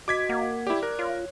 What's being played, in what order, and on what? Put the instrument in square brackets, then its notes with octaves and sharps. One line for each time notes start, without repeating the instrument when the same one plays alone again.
[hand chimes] F#4 D#5 [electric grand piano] D6 G#6 B6
[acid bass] A#3 [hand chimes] F#5
[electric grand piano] E4 G4 [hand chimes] D5 D6
[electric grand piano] A#4 [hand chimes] F#6
[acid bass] F4 [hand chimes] C#5